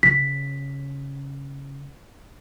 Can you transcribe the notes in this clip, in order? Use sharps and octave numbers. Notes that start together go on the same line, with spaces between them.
C#3 B6